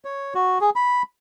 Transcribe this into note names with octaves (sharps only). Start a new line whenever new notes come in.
C#5
F#4
G#4
B5